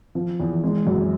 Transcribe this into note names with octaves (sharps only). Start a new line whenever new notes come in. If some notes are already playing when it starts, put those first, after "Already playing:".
F3
E2
G#3
F#2